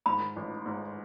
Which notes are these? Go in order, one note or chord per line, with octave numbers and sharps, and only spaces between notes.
G#2 B5
A1
G#2